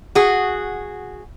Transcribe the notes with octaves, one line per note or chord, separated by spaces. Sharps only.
F#4 G#4